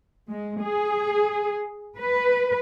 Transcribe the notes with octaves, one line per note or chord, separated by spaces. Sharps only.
G#3
G#4
B4